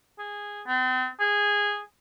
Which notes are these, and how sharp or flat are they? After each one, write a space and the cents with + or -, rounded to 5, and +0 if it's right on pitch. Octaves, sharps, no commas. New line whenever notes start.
G#4 -10
C4 -40
G#4 -10